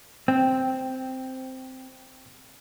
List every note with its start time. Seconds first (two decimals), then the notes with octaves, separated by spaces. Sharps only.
0.28 C4 G5